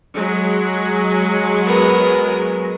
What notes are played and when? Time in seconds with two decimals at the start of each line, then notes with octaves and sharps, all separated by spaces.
0.14 F#3 G#3
1.66 B3 A#4